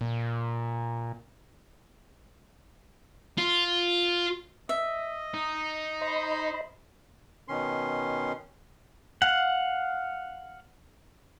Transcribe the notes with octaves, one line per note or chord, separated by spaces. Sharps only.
A#2
F4
D#5 E5
D#4
C5 D#5 B5
B2 D#3 C#4 C6
F5 F#5